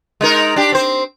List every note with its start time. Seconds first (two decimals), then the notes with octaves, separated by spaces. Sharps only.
0.21 G#3 D#4 A#4
0.56 D4 G4
0.72 C4 C5